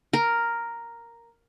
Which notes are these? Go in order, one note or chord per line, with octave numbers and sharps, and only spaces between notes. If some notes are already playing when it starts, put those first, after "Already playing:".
A#4